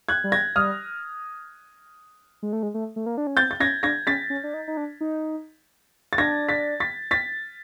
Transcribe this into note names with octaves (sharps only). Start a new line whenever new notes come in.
F#6 G#6
G3
G#6 A#6
G3 D#6 F6
G#3
A3
G#3
A3
A3
A#3
D4
C#4
C4 G6 A6
A6
C#4 G#6 A#6
D4 G#6 A#6
C#4 A6 B6
C#4
D4
D#4
D#4
D4
D#4
A6
D4 G#6 A#6
A6 B6
A6 B6
A6 B6